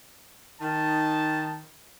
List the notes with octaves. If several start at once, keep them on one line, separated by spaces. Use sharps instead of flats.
D#3 D#4 A5